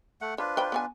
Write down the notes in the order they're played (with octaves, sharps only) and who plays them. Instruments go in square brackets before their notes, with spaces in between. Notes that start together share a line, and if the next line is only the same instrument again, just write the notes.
[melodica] A3 F#5
[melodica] D4 F4 B4 [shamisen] C5
[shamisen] C5 G5 B5
B3 C#5 G#5